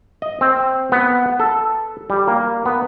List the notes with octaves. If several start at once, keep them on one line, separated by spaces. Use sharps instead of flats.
D#5
C4
B3
A4
G3
A#3
B3